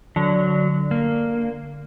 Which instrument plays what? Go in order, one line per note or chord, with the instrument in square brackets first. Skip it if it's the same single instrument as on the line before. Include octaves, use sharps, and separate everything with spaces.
[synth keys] D3 [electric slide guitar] F#3
[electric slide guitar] A#3